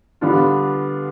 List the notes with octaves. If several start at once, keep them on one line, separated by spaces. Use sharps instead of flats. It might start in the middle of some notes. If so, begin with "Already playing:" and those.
D3 G3 B3 D4 F4